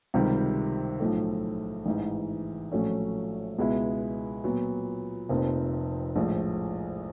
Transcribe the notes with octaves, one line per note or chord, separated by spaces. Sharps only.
C#2 C3 D#3 G3
B1 A2 F3 A3
A1 G#2 E3
A#1 A2 F#3 A3 C#4
C#2 B2 G#3 B3 E4
A#2 F#3 B3
F1 F2 C3 F3 A#3
A#1 A2 F3 G#3